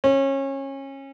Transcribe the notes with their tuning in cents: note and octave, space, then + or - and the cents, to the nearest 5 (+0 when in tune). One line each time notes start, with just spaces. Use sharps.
C#4 -25